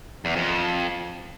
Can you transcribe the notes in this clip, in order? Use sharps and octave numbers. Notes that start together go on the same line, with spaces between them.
E2
F2